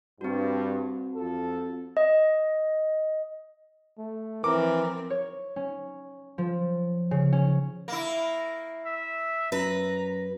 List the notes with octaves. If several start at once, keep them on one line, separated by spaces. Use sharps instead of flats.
G2 C4 F#4
F2 F3 A4
D#5
A3
E3 F3 C4 A#4 D6
C#5
C#4
F3
C#3
C#4
A#3 E4
E5
F#2 B4 A#5